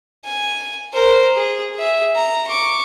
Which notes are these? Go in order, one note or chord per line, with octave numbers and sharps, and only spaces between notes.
G#5
A#4 C5
G#4
G#4 E5
A#5
C#6 D6